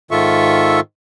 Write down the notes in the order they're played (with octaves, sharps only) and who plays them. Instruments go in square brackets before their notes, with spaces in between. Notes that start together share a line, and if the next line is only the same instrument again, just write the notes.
[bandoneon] G#2 D#3 F4 A4 E5 C#6